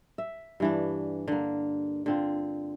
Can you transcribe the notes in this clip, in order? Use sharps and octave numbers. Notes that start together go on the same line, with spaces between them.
E5
G2 E3 D4
D3 A#3
D3 C4 F4